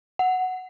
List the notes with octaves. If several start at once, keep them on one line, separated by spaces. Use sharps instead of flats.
F#5